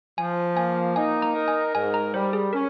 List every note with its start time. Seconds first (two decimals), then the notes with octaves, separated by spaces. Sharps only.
0.17 F3 G#5
0.56 A#3 G#5
0.96 D#4 G#5
1.22 A#5
1.35 A#4
1.48 G#5
1.75 G#2 G#5
1.94 A#5
2.14 G3 C5
2.33 G#4
2.53 C#4 A#4